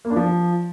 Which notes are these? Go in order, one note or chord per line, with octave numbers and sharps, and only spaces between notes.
A#3
D4
F3